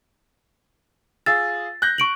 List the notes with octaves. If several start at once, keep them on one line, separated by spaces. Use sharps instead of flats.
F4 G#4 E6 A6
F#6 G6 A#6
C#6 D7 F#7